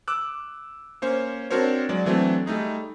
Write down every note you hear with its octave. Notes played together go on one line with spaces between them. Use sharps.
D6 E6 F#6
A#3 C#4 C5 C#5
C4 D4 F#4 A#4 C5 C#5
F#3 G#3 D5
E3 F#3 A3 C4 D4
G3 A3 D#4 G#4